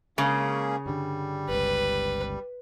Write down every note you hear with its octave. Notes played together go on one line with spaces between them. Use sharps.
C#3 G#3 A#3 C#4 G#4
G2 D3 G3
G1 C#2 B4